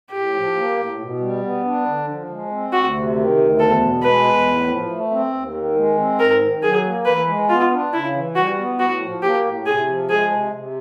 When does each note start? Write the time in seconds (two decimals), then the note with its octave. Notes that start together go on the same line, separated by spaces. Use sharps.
0.12 A2 G4
0.34 F3
0.55 A#3
0.77 A2
0.99 B2
1.20 G3
1.42 B3
1.64 D4
1.86 D3
2.07 F3
2.29 G#3
2.51 C4
2.72 D2 F#4
2.94 C3
3.16 D#3
3.37 D2
3.59 E2 A4
3.81 B2
4.02 G#3 B4
4.24 E2
4.46 A2
4.67 F3
4.90 A3
5.11 C4
5.33 D#2
5.54 D#3
5.75 G#3
5.97 C4
6.19 G#2 A#4
6.41 D#3
6.62 F#3 G#4
6.84 A#3
7.06 E3 B4
7.27 G#3
7.49 B3 F4
7.71 D4
7.93 C#3 E4
8.14 E3
8.36 G3 F#4
8.58 B3
8.79 A2 F#4
9.01 F3
9.22 A#3 G4
9.45 A2
9.66 C3 G#4
9.88 F3
10.09 G#3 G#4
10.31 C3
10.53 C3